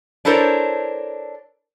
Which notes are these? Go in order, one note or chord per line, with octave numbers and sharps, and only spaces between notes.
D4 E4 A4 A#4 C5 C#5